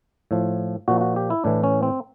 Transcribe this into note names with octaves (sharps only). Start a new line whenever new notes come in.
A2 F3
A#2 F3 F#4
F#4
G4
E4
A2 E3 D4
C#4
C4